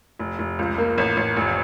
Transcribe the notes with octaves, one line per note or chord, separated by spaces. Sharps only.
F1
F1
C#2
A#3
A1
A1
F1